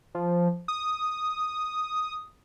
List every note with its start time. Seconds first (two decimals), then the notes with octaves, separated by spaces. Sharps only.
0.15 F3
0.68 D#6